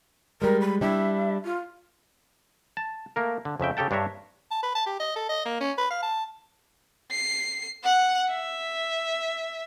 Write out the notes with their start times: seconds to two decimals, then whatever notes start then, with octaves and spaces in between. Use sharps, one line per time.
0.42 G3 G#3 A#4
0.61 B5
0.81 G3 D4 E4 E5
1.45 F4
2.77 A5
3.16 A3 A#3 A#4
3.45 D3
3.60 F2 C#3 E5 G5
3.77 C#3 G4 A4 G5 A5
3.91 G2 D4 C#5 E5 A#5
4.51 A5
4.63 B4
4.75 A5
4.86 G4
5.00 D#5
5.16 A4
5.29 D#5
5.45 A#3
5.60 C#4
5.78 B4
5.90 F5
6.02 A5
7.11 C7
7.84 F#5
8.31 E5